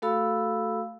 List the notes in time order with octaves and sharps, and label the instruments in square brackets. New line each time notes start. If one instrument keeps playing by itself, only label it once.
[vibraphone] A3 F#4 A4 F5 B5 E6